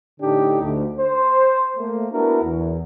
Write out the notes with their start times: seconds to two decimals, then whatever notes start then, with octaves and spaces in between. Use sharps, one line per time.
0.21 A2 D3 D4 D#4 G4
0.62 D2
0.98 C5
1.77 A3 A#3
2.12 B3 D4 E4 F#4 A#4
2.42 E2